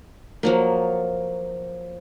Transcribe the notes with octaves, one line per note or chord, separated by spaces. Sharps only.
F3 F#3 A#3